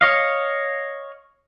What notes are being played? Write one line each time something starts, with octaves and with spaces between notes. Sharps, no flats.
C#5 D#5 F5